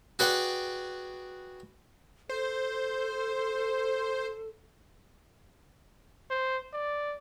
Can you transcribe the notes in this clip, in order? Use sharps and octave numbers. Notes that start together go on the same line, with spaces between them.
F#4 G#4 B4 D5 F#5 G5
A4 C5
C5
D5